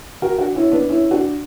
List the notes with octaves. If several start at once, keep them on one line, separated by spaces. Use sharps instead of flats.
F#4 A#4
D4 F#4
C#4 E4
B3 D4
C#4 E4
D4 F#4